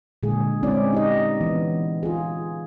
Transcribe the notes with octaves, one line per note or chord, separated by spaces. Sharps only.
A#2 D3 G#3 G#4
G#3 C4 C#4 E4 D5
D#4 G4 D#5
E3 B3
F4 G#4